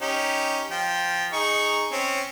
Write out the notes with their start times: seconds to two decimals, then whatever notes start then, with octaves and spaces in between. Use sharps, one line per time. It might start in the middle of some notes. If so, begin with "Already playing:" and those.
0.02 C#4 D#4 G4
0.71 F3 G5
1.33 D#4 G#4 C#6
1.92 C4 C#4